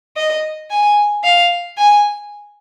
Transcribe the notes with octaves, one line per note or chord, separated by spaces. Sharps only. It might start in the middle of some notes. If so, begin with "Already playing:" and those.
D#5
G#5
F5
G#5